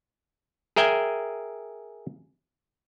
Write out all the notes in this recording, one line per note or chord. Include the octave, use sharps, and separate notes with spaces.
G#4 A#4 E5 G5 G#5